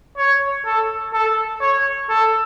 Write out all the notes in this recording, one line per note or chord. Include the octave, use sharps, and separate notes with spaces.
C#5
A4
A4
C#5
A4